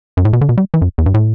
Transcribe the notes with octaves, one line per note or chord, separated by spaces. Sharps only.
F#2
A2
B2
D3
B2
G3
E3
F#2
E2
G2
A2